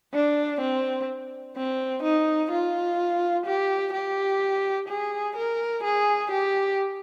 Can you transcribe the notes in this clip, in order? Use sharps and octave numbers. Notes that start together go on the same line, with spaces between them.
D4
C4
C4
D#4
F4
G4
G4
G#4
A#4
G#4
G4